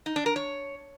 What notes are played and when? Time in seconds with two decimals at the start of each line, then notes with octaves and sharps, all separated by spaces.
0.06 D#4
0.16 D4
0.26 A#4
0.36 C#5